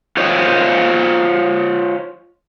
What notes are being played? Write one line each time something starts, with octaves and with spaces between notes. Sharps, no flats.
F4 C5 C#5 D#5